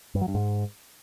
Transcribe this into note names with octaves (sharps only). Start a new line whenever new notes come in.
G2
F#3
G2
G#2